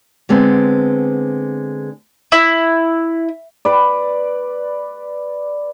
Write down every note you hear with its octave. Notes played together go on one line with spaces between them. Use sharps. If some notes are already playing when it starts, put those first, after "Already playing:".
D3 G#3 B3 C4
E4
B4 D5